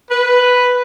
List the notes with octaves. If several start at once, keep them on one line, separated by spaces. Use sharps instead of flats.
B4